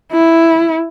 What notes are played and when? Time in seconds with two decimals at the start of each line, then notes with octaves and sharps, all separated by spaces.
0.12 E4